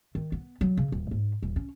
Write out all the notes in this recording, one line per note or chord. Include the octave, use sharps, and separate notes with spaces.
D#3
B3
F#3
C#3
D#1
G#2
D#1
C#4